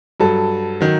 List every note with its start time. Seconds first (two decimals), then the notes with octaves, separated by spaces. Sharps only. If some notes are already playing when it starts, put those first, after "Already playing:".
0.20 G2 F#3 A4
0.80 D#3 F#3